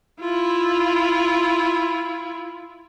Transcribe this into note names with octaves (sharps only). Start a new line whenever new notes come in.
E4 F4